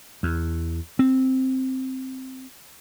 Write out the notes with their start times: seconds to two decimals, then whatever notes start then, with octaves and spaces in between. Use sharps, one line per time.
0.23 E2
0.99 C4